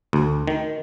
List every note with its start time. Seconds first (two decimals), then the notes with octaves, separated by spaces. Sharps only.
0.13 D2
0.47 D#3